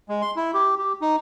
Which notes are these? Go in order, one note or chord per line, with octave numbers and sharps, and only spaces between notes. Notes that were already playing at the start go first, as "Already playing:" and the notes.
G#3
C6
E4
G4
G4
D#4